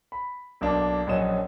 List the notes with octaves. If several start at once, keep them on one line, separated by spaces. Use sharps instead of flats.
B5
B1 A#3 D4
A#1 F#2 C#4 D#5 E7